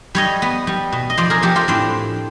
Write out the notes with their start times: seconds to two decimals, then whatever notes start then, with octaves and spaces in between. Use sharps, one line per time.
0.15 G3 C#5 D#5
0.42 B3
0.67 G3
0.92 B2
1.10 D#5
1.17 F3 C5 D5
1.30 G#4 A#4
1.42 F3 G4 A4
1.56 F4 G4
1.68 A2 C4 D4